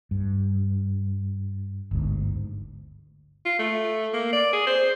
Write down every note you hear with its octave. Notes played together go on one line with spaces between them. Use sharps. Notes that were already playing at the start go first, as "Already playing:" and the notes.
G2
G1 D2 G#2
F4
A3
A#3
D5
G#4
C5